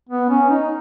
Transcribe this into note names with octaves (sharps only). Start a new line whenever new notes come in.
B3
C#4
D#4